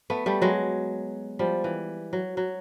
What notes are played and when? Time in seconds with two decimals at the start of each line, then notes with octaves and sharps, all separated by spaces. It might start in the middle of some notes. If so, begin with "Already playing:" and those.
0.10 A3 B3
0.26 G3 A3
0.42 F#3 G#3
1.39 F3 G3
1.64 E3
2.13 F#3
2.37 F#3